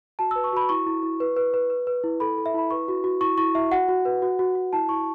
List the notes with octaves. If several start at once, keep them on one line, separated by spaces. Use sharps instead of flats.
F#4 A5
E6
B4
C#6
F#4 B5
E4 C#6
E4
E4
B4
B4
B4
B4
B4
E4
A4 B5
A4
E5
E4 B5
B4 C#6
F#4
F#4
E4 C#6
E4 C#6
E4 E5
F#4 F#5
F#4
B4
F#4
F#4
F#4
E4 A5
E4 C#6